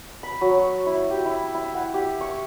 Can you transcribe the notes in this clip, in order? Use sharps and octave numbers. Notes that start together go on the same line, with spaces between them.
B5
F#3
C#6
E4
G4
E4
E4
F#5
G4
C#6